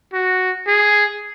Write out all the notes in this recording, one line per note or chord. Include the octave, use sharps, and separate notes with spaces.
F#4
G#4